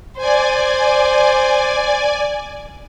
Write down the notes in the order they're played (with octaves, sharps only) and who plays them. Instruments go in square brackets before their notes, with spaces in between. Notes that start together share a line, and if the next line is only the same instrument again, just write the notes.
[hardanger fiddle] C5 [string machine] D5 G#5